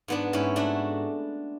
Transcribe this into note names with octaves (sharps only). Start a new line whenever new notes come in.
G#2 B3 D4
G#2 C#4 E4
A3 D4 F#4